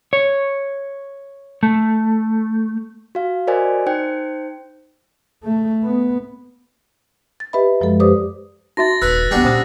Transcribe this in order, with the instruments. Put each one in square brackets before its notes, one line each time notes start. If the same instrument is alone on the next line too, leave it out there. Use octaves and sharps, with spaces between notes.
[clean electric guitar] C#5
A3
[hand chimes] F#4 F5
F#4 A#4 C5 D5 D#5 G#5
D#4 C5 G5
[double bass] A3
B3
[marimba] A6
G4 B4 D#5 E5 B5
F#2 F3 G#3 A4
G4 B4 C5 D5 D6 D#6
[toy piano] D#4 F#4 E5 [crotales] A6 A#6
[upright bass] D#1 [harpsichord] B4 [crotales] E6 F#6 B6
[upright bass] D#2 B3 [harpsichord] G3 D4 F#4
[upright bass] A#2 [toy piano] C#4 C5 D#6